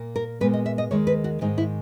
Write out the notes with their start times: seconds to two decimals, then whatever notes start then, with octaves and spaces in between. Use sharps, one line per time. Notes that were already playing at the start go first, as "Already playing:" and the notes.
Already playing: A#2 A#3
0.16 A#4
0.41 A#2 G#3 B3 B4
0.53 D#5
0.66 E5
0.78 D#5
0.91 D#2 D#3 G#3 C#5
1.07 B4
1.24 F#4
1.41 G#2 D#3 G#3 D#4
1.58 E4